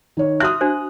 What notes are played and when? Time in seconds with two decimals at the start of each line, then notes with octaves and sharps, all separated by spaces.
0.17 D#3 C#5
0.40 F#4 E5 D#6 F6 F#6
0.61 D4 F#4 C5